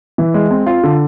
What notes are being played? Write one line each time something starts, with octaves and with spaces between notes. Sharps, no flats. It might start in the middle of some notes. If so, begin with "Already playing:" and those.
E3
G#3
C4
F4
D3